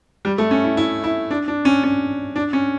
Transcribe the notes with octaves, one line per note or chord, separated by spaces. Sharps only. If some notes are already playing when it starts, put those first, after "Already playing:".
G3
A3
C#4
E4
E4
E4
D4
D4
C#4
C#4
D4
C#4